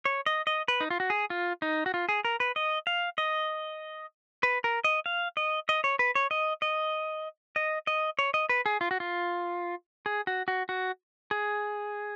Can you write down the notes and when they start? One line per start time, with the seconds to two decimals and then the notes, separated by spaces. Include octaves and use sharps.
0.05 C#5
0.26 D#5
0.47 D#5
0.68 B4
0.80 D#4
0.90 F4
1.00 F#4
1.10 G#4
1.30 F4
1.62 D#4
1.86 F#4
1.94 F4
2.09 G#4
2.25 A#4
2.40 B4
2.56 D#5
2.87 F5
3.18 D#5
4.43 B4
4.64 A#4
4.84 D#5
5.06 F5
5.37 D#5
5.69 D#5
5.84 C#5
5.99 B4
6.15 C#5
6.31 D#5
6.62 D#5
7.56 D#5
7.87 D#5
8.19 C#5
8.34 D#5
8.49 B4
8.66 G#4
8.81 F4
8.91 F#4
9.00 F4
10.06 G#4
10.27 F#4
10.48 F#4
10.69 F#4
11.31 G#4